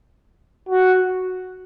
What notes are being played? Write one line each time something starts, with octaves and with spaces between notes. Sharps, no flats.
F#4